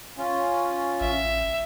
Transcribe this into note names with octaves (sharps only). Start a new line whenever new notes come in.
C#4 F4
A1 E5